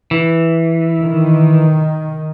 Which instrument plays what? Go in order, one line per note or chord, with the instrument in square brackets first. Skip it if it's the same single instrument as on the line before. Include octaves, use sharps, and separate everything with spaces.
[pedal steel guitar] E3
[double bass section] D#3